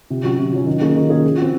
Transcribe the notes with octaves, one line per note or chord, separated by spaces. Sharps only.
C3
F#3 C#4
C3
F#3 C#4
D#3
A#3 C#4 G#4
D#3
A#3 C#4 G#4
F3
C4 F#4